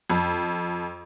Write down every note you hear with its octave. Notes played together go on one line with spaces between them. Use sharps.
F2